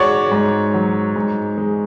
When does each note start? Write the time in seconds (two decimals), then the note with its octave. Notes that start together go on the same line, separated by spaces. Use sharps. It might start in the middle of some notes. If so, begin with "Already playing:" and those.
Already playing: G#2 G#3 F#4 C#5 D5
0.31 G#2
0.74 F#3
1.16 G#2
1.58 G#3